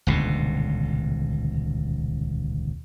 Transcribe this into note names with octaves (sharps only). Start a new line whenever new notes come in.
D#1 C#2 B2 D3